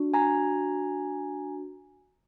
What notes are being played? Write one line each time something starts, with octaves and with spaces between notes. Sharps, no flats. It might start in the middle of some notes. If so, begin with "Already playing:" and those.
Already playing: D4 F#4
G#5 A#5